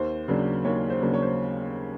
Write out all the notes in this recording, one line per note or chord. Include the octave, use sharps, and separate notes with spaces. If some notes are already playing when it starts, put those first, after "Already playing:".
Already playing: D#2 C5
C#3 F#3 A#3 D4
D#2 C#5
C5
C#3 F#3 A#3 D4
C#5
C5